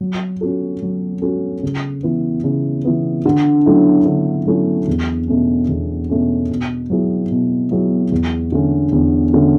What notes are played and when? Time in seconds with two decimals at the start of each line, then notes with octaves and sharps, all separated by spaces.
0.01 F#3
0.41 C#4 F#4 A4
0.82 F#3
1.22 C#4 F#4 A4
1.63 C#3
2.03 E3 B3
2.44 C#3
2.85 E3 B3
3.26 D3
3.66 F#3 A3 C#4 E4
4.06 D3
4.46 F#3 A3 C#4 E4
4.88 E2
5.28 B2 A3 C#4
5.69 E2
6.09 B2 A3 C#4
6.49 B2
6.90 F#3 B3 E4 G#4
7.31 B2
7.71 F#3 B3 E4 G#4
8.12 E2
8.52 D3 A3 C#4
8.92 E2
9.33 D3 A3 C#4